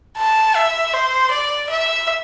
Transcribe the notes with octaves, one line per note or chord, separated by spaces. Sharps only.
A5
E5
C5
D5
E5